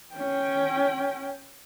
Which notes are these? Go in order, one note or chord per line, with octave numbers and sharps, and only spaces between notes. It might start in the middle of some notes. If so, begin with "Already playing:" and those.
C#4 G5